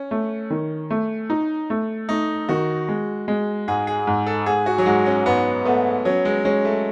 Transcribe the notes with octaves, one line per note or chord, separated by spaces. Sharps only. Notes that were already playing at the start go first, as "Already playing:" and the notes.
Already playing: C#4
A3
D#3
A3
D#4
A3
A3 D#4
D#3 F#4
G#3
G#3
G#2 G#4
G#4
G#2
A4
G#2 G#4
F#4
F#3
G#2 G#3
C#4
G#2 B3
A3 B3
F#3 C#4
G#3
G#3 C#4
A3